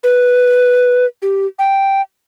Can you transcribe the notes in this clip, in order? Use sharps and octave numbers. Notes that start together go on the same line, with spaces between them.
B4
G4
G5